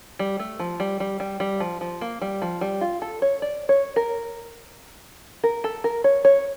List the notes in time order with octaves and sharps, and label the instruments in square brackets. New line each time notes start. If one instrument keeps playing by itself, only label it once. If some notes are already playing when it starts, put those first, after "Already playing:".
[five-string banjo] G3
A3
F3
G3
G3
G3
G3
F3
F3
A#3
G3
F3
G3
F4
A4
C#5
D5
C#5
A#4
A#4
A4
A#4
C#5
C#5